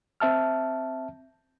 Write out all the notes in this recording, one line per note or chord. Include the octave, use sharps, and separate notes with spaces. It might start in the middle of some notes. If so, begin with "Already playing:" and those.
C4 E5 A5 F6